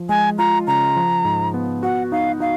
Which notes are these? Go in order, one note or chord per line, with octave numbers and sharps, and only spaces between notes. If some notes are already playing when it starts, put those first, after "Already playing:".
Already playing: F3
G#3 G#5
F4 A#5
C#3 A#5
F3
G#2
B3
F#4 F#5
D#4 F5
D#4 F5